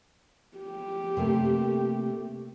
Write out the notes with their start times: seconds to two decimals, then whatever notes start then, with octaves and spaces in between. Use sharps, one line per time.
0.57 G4
1.17 C3 A3 A#3